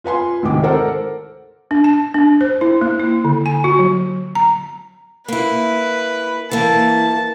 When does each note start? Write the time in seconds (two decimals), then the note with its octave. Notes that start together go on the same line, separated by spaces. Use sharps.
0.04 F4 B4 G#5 C6
0.43 D2 G#2 C3 D#3 D6
0.63 A4 A#4 C5 F#5
1.71 D4
1.84 A5
2.14 D4
2.41 C5
2.61 E4
2.81 A#3
2.99 E4
3.25 D3
3.46 G#5
3.64 F#4
3.79 F#3
4.35 A#5
5.28 A#3 E4 B4
6.51 E3 A#3 A5